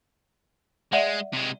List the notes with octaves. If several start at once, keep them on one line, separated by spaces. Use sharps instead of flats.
G#3 D5 E5 F#5
C3 G#3